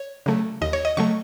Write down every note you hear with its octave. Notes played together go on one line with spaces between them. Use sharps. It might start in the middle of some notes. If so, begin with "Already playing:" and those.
Already playing: C#5
C#3 F#3 A3
D#2 D#5
C#5
D#5
C#3 F#3 A3 C#6